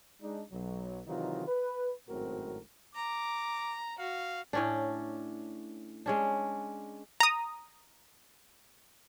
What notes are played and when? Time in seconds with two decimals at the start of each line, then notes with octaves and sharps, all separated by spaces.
0.22 G#3 D4 D#4
0.52 B1 F#3
1.08 C3 D#3 E3 F#3 D#4 F4
1.47 B4
2.09 G#1 F#2 A2 C4 F#4 A#4
2.95 A#5 D6
3.99 F#4 F5
4.53 A2 C#4 D4
6.06 G#3 C#4 D4
7.20 A#5 D#6